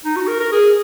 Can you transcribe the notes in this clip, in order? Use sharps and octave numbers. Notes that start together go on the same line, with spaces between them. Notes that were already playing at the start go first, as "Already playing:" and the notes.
D#4
F#4
A#4
A#4
G#4